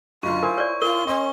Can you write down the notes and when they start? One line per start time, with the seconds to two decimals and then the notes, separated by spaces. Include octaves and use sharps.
0.23 F#1 B1 D3 F4 C#6
0.43 E4 A#4 C5 G#5
0.58 C#5 D5
0.82 F4 A#4 G7
1.07 C#4 D#5 C6